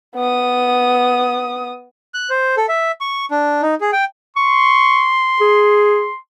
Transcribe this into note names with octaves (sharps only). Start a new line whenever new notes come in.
B3 D#6
F#6
C5
A4
E5
C#6
D4
D#4
G#4
G5
C6 C#6
G#4